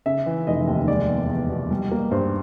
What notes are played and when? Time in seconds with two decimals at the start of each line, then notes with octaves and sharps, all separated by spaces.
0.06 C#3 E5
0.26 E3
0.47 F1 D#5
0.67 D#2
0.88 G#3 D5
1.08 E2
1.29 E2
1.50 B2
1.71 G3
1.92 A#3
2.11 G2 C5